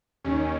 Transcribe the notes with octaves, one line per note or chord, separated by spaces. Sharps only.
D#2 D#3 C#4